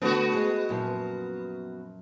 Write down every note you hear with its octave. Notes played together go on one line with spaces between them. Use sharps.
D3 A3 B3 F#4 A4
G#3
F#2 A#2 F3